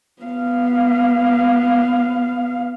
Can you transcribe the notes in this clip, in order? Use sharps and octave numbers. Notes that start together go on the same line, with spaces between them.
B3 F5